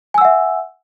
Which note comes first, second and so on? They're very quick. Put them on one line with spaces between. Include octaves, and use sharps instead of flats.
G#5 E6 F#5 E5